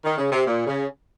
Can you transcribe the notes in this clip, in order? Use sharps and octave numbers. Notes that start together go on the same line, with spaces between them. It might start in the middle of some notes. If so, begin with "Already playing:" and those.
D#3
C#3
C3
A#2
C#3